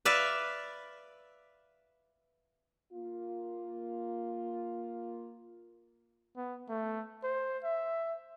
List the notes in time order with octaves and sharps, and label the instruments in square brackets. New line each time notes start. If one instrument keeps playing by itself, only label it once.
[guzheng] B4 D5 E5 F5
[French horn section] A#3 F4
[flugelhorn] B3
A3
C5
E5